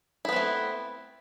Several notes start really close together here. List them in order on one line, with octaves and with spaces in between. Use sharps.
E4 B3 C4 A3